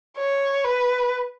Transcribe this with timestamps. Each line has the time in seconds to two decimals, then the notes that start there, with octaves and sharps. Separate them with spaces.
0.18 C#5
0.64 B4